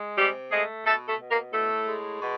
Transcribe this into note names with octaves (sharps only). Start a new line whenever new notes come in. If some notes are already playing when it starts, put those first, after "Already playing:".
Already playing: G#3
C3 G3 G4
G#3 A3 G#4
B2 A3 A4
A3 A4
B2
A#3 A#4
A2 A3 A4
G#3
B2